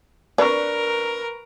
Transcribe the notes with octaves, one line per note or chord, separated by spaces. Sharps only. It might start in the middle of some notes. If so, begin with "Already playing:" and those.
D4 A#4 B4 C#6